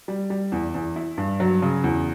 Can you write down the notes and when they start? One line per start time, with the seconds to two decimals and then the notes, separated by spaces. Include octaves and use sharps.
0.08 G3
0.30 G3
0.52 E2
0.75 E2
0.96 E4
1.18 G2
1.40 F#3
1.62 C#3
1.84 E2